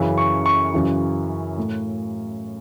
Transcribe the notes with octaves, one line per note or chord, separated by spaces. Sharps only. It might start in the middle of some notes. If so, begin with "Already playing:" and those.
Already playing: F#2 C#3 E3
C#6
C#6
F#2 C#3 E3
A2